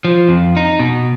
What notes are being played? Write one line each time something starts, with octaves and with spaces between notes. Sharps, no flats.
F3
F2
D#4
B2